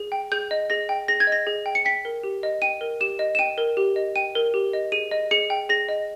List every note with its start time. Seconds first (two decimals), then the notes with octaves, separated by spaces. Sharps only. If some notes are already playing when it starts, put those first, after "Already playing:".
Already playing: G#4
0.12 G5
0.32 G#4 G6
0.51 D#5
0.70 G#4 A#6
0.89 G5
1.08 G#4 A#6
1.20 G#6
1.27 D#5
1.32 A#6
1.47 G#4
1.66 G5
1.75 C#7
1.85 G5 B6
2.05 A#4
2.23 G4
2.43 D#5
2.62 G5 D#7
2.81 A#4
3.00 G4 E7
3.19 D#5
3.35 E7
3.39 G5 D#7
3.58 A#4
3.77 G4
3.96 D#5
4.16 G5 D#7
4.35 A#4
4.54 G4
4.73 D#5
4.92 G#4 D#7
5.11 D#5
5.31 G#4 C#7
5.50 G5
5.69 G#4 A#6
5.89 D#5